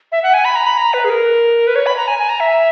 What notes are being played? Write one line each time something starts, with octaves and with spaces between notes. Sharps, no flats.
E5
F#5
G#5
B5
A#5
B5
A#5
B4
G#4
A#4
B4
C#5
B5
A#5
G#5
G#5
A#5
E5